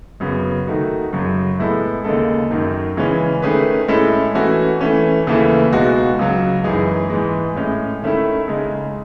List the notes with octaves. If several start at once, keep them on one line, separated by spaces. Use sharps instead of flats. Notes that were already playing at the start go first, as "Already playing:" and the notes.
F#2 C#3 F#3 B3
D#3 A3 D#4 F#4
F#2 C#3 F#3
A2 G#3 B3 E4 A4
D#2 C#3 G#3 D#4 A4
F#2 D#3 F#3
C#3 E3 G#3 C#4
D#3 A3 C#4 G#4 B4
A2 G#3 C#4 E4 A4
E3 A3 C#4 F#4
E3 A3 C#4
D#2 C#3 E3 A3 E4
C#2 B2 G#3 D#4 F#4
C#2 C#3 F#3
F#2 E3 G#3 D#4 G#4
G#2 E3 G#3
A2 G#3 C#4
D#3 A3 C#4 E4
C#3 G#3 D#4